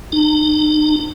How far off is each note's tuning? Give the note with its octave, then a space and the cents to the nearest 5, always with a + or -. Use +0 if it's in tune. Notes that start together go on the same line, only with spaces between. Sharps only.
D#4 -40